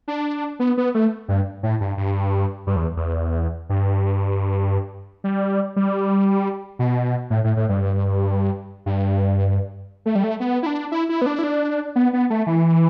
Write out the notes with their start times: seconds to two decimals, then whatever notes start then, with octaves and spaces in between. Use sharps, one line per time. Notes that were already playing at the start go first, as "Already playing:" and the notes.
0.08 D4
0.60 B3
0.77 B3
0.95 A3
1.28 G2
1.63 A2
1.81 G2
1.97 G2
2.67 G2
2.76 E2
2.97 E2
3.69 G2
5.24 G3
5.76 G3
6.79 B2
7.30 A2
7.44 A2
7.57 A2
7.69 G2
8.86 G2
10.06 A3
10.15 G3
10.24 A3
10.40 B3
10.63 E4
10.66 D4
10.92 E4
11.09 E4
11.22 B3
11.26 D4
11.39 E4
11.44 D4
11.96 B3
12.13 B3
12.30 A3
12.47 E3